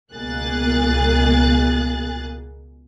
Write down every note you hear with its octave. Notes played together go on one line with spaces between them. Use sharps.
C#2 B2 A#3 G#4 F#6 A6